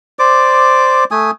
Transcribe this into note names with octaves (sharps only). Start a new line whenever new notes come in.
C5 D5 D6
A3 G#5 D#6